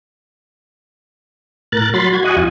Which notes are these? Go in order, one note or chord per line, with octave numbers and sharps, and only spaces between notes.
A2 A#4 F#6 A6
F#3 B5 C6 A6
F#4 G#6
F#4 D#5 F#5 G#5
F2 F4 G#5